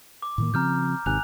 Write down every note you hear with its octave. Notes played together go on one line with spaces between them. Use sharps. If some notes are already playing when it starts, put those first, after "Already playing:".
D6
A2 D#3 A#3
C#3 F3 C4 A#5 F6 G6
G#1 C3 D#3 G#5 F#6 F7